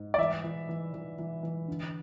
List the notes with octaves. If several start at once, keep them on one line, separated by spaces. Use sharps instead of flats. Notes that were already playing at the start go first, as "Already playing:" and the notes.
Already playing: G#2
D5
E3 E5
E3
E3
E3
E3
E3
D3